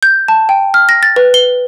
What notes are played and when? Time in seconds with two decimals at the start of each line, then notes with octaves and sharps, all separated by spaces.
0.03 G6
0.28 A5
0.49 G5
0.74 F6
0.89 A#6
1.03 A6
1.16 B4
1.34 G7